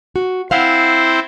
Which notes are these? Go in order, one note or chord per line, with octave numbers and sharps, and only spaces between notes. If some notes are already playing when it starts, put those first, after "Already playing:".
F#4
C4 E4 C5 F5 F#5